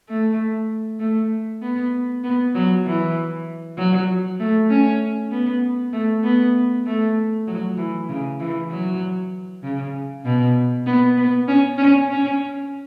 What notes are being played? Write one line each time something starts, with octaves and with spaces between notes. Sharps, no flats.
A3
A3
B3
B3
F#3
E3
F#3
A3
C#4
B3
A3
B3
A3
F#3
E3
C#3
E3
F#3
C#3
B2
B3
B3
C#4
C#4
C#4